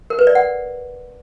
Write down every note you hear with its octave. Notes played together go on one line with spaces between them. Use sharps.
A#4
B4
D5
F#5